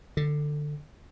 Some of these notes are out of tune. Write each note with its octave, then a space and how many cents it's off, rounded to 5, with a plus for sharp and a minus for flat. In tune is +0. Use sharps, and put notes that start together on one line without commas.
D3 +15